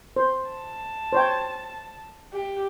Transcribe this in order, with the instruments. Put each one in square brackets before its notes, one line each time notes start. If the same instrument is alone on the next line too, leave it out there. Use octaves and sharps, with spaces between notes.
[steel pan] C5
[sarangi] A5
[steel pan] C5 C#5 G5
[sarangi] G4